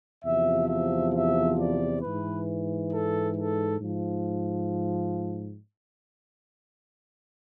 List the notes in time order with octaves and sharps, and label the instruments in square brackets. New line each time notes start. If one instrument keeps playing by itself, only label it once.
[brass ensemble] E2 C3 F3 E5
E5
E5
D5
G#2 E3 B4
A4
A4
G#2 F3